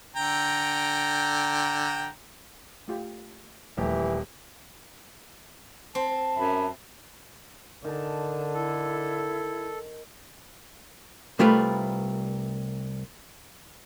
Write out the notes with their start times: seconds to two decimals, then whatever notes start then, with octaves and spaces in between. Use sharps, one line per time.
0.16 D3 G5 A#5
2.88 A3 F4 G4
3.77 D#1 E3 F3 A3 G4
5.95 C4 A5
6.36 F#2 E5 B5
7.85 D3 D#3 A5
8.54 E4 A4
11.39 C2 G3 A3 F4 A#4 B4